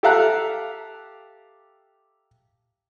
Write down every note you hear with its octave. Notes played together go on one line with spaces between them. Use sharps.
G4 A4 E5 F5 A#5 F#6